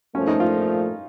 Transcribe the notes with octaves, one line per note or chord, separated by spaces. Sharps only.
A#2 F3 A3 C#4
D#4
F4